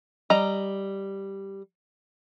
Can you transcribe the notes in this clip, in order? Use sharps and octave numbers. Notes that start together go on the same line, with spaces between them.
G3 D#5 A#5